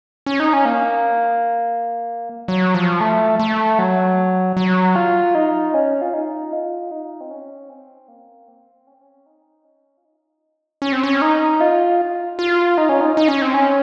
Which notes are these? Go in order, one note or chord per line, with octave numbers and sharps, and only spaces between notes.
C#4
D#4
C#4
A#3
F#3
F3
A3
A3
F#3
F#3
F4
D#4
C#4
F4
D#4
F4
D#4
C4
C#4
C4
A#3
C4
C#4
C4
C#4
D#4
C#4
F4
D#4
C#4
C4
C#4
D#4
F4
F4
D#4
C#4
D#4
D#4
C#4
C4
C#4